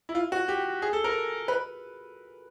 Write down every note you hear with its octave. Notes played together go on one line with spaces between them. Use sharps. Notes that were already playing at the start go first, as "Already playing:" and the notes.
E4
F4
F#4
G4
G#4
A4
A#4
B4